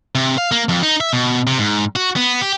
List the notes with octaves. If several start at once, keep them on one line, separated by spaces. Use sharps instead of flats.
C3
F5
A#3
F2
D#4
E5
B2
C3
G#2
F#4
B3
G4